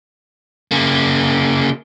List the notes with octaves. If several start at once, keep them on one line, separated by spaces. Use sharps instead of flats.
C#3 A#3